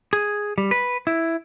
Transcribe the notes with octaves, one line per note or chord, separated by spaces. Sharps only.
G#4
G3
B4
E4